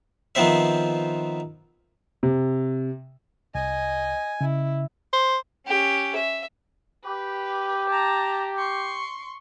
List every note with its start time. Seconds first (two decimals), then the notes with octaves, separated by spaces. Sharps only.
0.35 D#3 F3 B3 C4 C5 E5
2.23 C3
3.55 C2 D#5 G#5
4.41 C#3 E4
5.13 C5
5.67 C#4 G4
6.15 E5
7.04 G4 B4
7.90 A5 A#5
8.58 C6 C#6